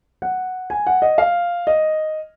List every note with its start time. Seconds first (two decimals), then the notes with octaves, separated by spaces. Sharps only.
0.22 F#5
0.70 G#5
0.86 F#5
1.02 D#5
1.18 F5
1.67 D#5